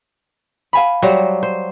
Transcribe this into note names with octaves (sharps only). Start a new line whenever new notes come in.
F5 G#5 B5
F#3 G3 C5
C5